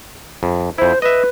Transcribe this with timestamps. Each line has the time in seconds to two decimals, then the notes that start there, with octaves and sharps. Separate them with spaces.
0.43 F2
0.78 F2 E4 C5
1.02 B4 D#5 E5